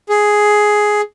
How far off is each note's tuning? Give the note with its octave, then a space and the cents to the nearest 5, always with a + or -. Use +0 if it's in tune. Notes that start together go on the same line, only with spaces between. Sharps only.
G#4 +5